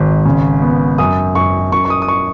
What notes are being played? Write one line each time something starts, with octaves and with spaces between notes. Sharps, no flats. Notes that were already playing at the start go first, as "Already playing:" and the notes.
Already playing: G#1 G#2
C#3
B3
F#2 D#6
F#2 C#6
F#2 C#6
C#6
D#6
D#6
C#6